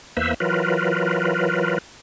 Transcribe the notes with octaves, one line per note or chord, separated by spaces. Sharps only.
E2 A#3 B4 C5 E5 E6
E3 F#3 F4 A#4 B4